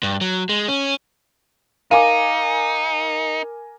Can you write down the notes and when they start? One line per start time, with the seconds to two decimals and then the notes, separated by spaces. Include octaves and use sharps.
0.03 G2
0.21 F#3
0.49 G#3
0.68 C#4
1.91 D#4 A#4 F5 G#5 D6